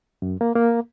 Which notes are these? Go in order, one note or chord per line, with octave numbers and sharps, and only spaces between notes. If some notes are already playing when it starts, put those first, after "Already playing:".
F#2
A#3
A#3